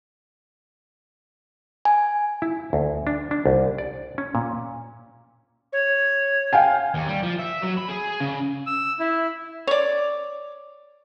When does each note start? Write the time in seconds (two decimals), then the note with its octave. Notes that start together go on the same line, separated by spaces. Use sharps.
1.85 G#5
2.42 E4
2.73 D2
3.07 D4
3.31 D4
3.46 C2
3.78 D5
4.18 C#4
4.35 A#2
5.73 C#5
6.53 F5 G5 G#5
6.94 D#2
7.08 G3
7.23 F3
7.40 E5
7.63 F#3
7.78 B5
7.89 G#4
8.20 C#3
8.67 E6
9.00 E4
9.67 C#5 D5